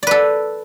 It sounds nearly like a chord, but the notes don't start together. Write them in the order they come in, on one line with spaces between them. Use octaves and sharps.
D5 B4 A4